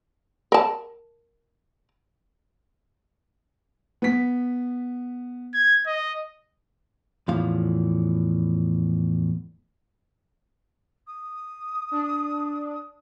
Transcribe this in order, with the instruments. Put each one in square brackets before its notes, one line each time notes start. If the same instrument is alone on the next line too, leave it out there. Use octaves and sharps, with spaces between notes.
[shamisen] A#4 A5
[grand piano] B3 B6
[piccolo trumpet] G#6
D#5
[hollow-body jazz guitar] E2 A2 F3 F5
[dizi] D#6
[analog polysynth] D4